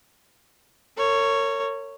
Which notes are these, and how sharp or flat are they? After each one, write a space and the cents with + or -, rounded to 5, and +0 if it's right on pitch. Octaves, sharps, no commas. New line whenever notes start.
A#4 -35 C#5 +0